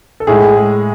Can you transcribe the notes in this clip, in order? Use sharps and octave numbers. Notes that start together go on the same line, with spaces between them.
A4
A2 G#3 G#4
G#3